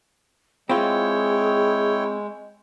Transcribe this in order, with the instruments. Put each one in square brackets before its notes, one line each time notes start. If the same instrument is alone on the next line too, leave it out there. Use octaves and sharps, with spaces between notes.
[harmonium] G#3 [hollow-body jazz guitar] C4 F4 [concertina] E4 C#5 G5 [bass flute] G#4